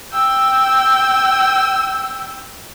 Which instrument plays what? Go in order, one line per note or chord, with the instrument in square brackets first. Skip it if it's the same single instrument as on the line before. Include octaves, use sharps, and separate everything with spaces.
[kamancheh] G5 E6